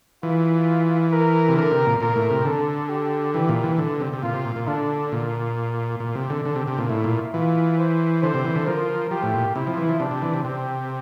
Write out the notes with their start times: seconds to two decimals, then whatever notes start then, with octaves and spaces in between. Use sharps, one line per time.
0.23 E3 F4
1.12 A#4
1.49 C3
1.56 D3 A#4
1.71 C3
1.86 A#2
2.00 A#2 A#4
2.16 A2
2.30 C3
2.45 D3 A4
2.89 G4
3.33 E3 G4
3.49 A#2
3.64 E3
3.79 D3
4.00 C3
4.13 C3
4.23 A#2 F4
4.34 C3
4.45 A#2
4.56 A#2
4.67 D3 D4
5.12 A#2
6.00 A#2
6.15 C3
6.30 D3
6.44 D3 D4
6.56 C3
6.67 C3
6.78 A#2
6.89 A2 E4
7.04 A#2
7.34 E3 F4
7.78 C5
8.23 D3 C5
8.34 C3
8.44 E3
8.55 D3
8.66 F3 A#4
9.11 F3 G4
9.23 A2
9.34 A#2
9.55 C3 E4
9.67 F3
9.78 E3
9.89 F3
10.00 C3 D4
10.11 C3
10.22 E3
10.34 C3
10.44 C3 C4